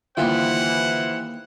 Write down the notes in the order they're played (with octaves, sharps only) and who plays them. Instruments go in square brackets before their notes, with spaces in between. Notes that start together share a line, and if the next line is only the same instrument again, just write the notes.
[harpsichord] D#2 G3 [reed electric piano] D3 F4 [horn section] E3 C5 [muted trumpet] F#5